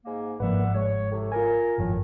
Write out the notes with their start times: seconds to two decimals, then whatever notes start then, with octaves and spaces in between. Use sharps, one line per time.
0.05 G#2 A#3
0.40 G1 G#2 F3 A#3 B4 D5 E5 F#5
0.75 G#3 C#5
1.10 A2 C3
1.32 F4 A#4 G#5
1.78 G#1 F#2 A2 D#3 F3